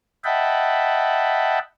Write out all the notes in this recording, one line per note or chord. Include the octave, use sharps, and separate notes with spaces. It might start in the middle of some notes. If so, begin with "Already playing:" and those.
D#5 E5 F#5 G5 A5 B5